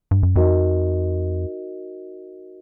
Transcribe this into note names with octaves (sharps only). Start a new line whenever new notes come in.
G2
F#2
F2 D#4 F#4 A#4 D#5